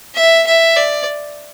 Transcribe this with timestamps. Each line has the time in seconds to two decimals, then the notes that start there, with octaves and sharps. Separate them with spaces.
0.15 E5
0.47 E5
0.77 D5